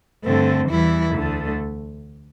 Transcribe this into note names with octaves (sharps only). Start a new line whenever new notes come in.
G2 D3 A3 C4
E2 E3 G3 E4
D2 D3 A3